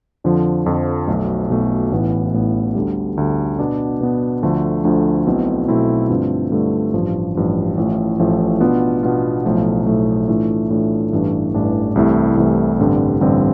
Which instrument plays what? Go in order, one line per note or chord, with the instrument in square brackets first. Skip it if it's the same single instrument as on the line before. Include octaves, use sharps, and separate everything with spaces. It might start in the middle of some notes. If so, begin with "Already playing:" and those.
[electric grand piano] F2 D3 F3
F2 D3 F3
B1 B2 A3
B1 B2 A3
A1 A2 E3 B3
A1 A2 E3 B3
D2 D3 G3
D2 D3 G3
B2 B3 D4
B2 B3 D4
D2 D3 F3 A3
D2 D3 F3 A3
B1 B2 A3 C4 E4
B1 B2 A3 C4 E4
G2 D3 A3 C4 F4
G2 D3 A3 C4 F4
A1 G2 F3
A1 G2 F3
A1 A2 F3 A3
A1 A2 F3 A3
B2 B3 D4 F4
B2 B3 D4 F4
B1 A2 F3 A3
B1 A2 F3 A3
A2 E3 A3 D4 F4
A2 E3 A3 D4 F4
A1 G2 E3 A3 D4
A1 G2 E3 A3 D4
C2 C3 E3 A3 E4
C2 C3 E3 A3 E4
A1 G2 D3 G3 C4
A1 G2 D3 G3 C4